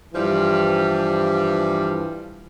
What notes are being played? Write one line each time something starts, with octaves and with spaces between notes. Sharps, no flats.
G2 E3 F3 G3